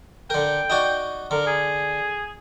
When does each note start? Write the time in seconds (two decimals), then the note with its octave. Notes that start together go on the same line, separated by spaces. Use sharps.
0.30 D3 A#4 G5
0.70 D#4 F#4 D5
1.31 D3 A#4
1.47 G#4